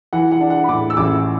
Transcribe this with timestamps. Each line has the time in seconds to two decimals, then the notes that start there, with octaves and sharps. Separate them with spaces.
0.13 E3 F#5
0.31 F#5
0.41 D4
0.50 F#5
0.64 B5
0.69 A2 D6
0.90 E6
0.97 A1 D6